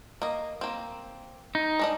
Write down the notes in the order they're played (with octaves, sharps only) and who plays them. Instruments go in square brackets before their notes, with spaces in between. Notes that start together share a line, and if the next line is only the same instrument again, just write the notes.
[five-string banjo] A#3 D#5
A#3 C4
[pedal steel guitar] D#4
[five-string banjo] G#3 D4 D#5